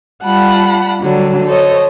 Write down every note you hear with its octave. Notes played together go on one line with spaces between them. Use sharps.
G3 F4 F#5 A5 B5
D3 F#3 G3
A4 C5 C#5 D#5